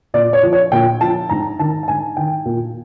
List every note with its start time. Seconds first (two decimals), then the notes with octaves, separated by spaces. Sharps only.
0.14 A#2 D5
0.33 C#5
0.43 F3
0.53 C#5
0.72 A#2 G5
1.01 F3 A5
1.29 G#2 A#5
1.59 D#3 A5
1.83 A5
1.88 G#2 G#5
2.17 D#3 G5
2.45 A#2